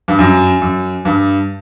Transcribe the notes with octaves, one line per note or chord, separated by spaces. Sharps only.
G2
F#2
F#2
G2